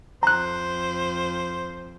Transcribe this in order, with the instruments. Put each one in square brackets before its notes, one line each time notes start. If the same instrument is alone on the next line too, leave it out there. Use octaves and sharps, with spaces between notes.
[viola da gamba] F2 [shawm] C5 [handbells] A#5 F#6